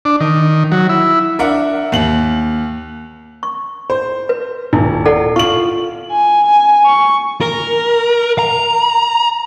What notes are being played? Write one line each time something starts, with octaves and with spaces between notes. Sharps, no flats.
D4
D#3
F#3
E4
D4 A#4 E5 F#5
D#2 F#7
C#6
C5
B4
D#1 E4
A4 D5 F#5
F4 C#6 F#7
G#5
G#5
C#6
A#4
A#5